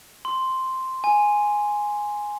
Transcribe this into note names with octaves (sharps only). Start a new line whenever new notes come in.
C6
G#5